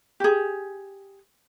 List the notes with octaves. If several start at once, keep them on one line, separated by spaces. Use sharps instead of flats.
G4 G#4